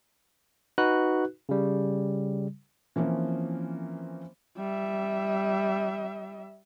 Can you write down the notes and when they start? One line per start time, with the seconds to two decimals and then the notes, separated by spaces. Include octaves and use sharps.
0.78 D#4 F#4 B4 F#6
1.49 C#3 G3
2.96 E3 F3 A#3 C4 C#4
4.58 G3 E5